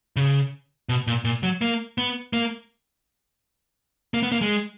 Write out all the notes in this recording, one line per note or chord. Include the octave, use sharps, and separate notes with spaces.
C#3
B2
A#2
A#2
F#3
A#3
B3
A#3
A#3
B3
A#3
G#3